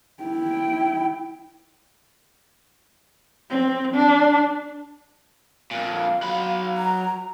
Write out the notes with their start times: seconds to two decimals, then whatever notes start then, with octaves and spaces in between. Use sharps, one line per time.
0.23 E4 G5
3.50 C4
3.95 D4
5.71 F2 A#2 F5
6.22 F#3 B5
6.77 A#5